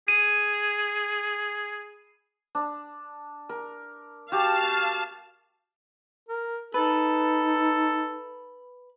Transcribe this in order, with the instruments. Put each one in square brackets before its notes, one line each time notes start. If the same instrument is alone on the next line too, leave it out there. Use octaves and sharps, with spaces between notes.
[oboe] G#4 [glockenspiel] D#7
[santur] D4
A#4
[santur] F#4 G4 [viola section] F5 A5
[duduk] A#4
[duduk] D#4 [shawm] A4 [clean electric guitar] B4